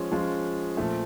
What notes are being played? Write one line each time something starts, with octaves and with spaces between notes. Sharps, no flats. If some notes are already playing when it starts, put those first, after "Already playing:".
Already playing: F3 G#3 C#4 F4
F3 G#3 C#4 F4
A#2 F3 A3